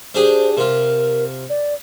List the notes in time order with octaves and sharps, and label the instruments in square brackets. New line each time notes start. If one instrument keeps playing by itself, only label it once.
[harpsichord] D4 G4 G#4 [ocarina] C5
[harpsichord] C3 F4 [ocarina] A#4
[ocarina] D5